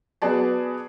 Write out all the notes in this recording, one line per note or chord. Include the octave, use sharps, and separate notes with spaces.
B3 F#4 G#4 D5 A5